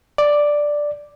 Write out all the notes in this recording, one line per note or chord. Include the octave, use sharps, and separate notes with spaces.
D5